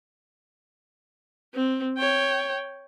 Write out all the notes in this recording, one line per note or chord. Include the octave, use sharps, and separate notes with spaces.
C4
C#5 G5